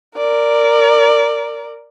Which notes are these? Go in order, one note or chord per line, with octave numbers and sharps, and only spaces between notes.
A#4 D5